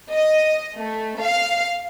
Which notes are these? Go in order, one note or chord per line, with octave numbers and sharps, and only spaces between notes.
D#5
A3
F5